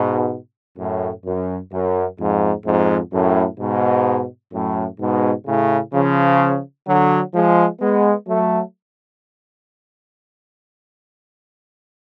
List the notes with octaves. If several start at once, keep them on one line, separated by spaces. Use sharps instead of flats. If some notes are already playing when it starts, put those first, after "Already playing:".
Already playing: G#2 B2
F#2 A2
F#2
F#2
F2 G#2
F2 G#2
F#2 A2
G#2 B2
F#2 A2
G#2 B2
A2 C#3
C#3 F3
D3 F#3
F3 G#3
G#3 B3
F#3 A3